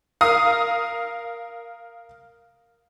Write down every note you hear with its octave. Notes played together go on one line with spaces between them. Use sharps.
A#4 F5 D#6